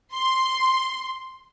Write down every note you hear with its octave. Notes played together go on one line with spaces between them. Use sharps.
C6